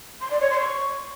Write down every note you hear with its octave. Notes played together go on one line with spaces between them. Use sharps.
C6
D5
C#5
C6
C#6